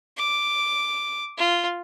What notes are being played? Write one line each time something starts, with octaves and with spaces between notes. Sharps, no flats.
D6
F4